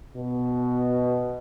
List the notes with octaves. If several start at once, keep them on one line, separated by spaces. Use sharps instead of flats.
B2